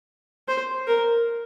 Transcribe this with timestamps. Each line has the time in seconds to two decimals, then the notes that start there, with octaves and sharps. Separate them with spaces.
0.48 C5
0.87 A#4